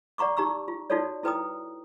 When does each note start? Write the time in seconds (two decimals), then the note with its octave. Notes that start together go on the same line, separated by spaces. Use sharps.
0.18 D5 F#5 A#5 C#6 D6
0.37 D#4 G4 A#5 C#6 E6
0.68 F4
0.90 D#4 F4 F#4 A4 C#5 D5
1.23 E4 A4 B4 G5 A#5 D#6